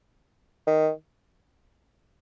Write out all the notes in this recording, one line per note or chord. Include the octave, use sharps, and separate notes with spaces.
D#3